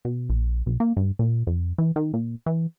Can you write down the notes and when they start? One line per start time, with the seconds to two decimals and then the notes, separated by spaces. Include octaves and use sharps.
0.05 B2
0.30 A#1
0.66 B1
0.80 A#3
0.97 G2
1.19 A#2
1.47 F2
1.78 E3
1.96 D#3
2.14 A#2
2.46 E3